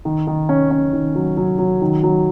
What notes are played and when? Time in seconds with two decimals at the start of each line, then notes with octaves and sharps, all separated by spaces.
0.05 D#3
0.27 D#3
0.49 C#4
0.71 C#4
0.93 D#3
1.15 F#3
1.37 F#3
1.59 F#3
1.82 D#3
2.03 F#3